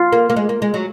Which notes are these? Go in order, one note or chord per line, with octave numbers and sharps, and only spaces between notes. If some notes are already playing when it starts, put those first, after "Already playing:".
Already playing: F4
A#3
A#3
G#3
A#3
G#3
F#3